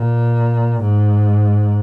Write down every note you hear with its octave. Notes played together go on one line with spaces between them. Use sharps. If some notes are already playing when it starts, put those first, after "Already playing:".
Already playing: A#2
G#2